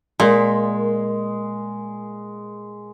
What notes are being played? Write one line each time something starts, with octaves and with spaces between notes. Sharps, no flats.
A#2 G#3